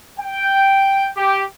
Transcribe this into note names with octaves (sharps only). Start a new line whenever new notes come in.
G5
G4